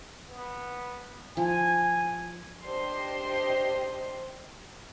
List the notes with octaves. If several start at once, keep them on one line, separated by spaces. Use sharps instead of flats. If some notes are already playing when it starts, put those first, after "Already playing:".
B3
F3 G#5
D4 G4 C5 D#5 C6